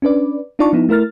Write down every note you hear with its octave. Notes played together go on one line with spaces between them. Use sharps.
C#4 D4 B4 D5
D4 D#4 F4 D5 A5 C#6
F3 B3 D#4 E4
A3 E4 A#4 F6 A6